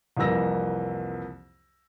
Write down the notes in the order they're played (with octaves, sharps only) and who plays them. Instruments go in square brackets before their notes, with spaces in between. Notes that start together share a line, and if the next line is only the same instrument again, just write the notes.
[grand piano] C2 F2 E3 A#3 E6 A#6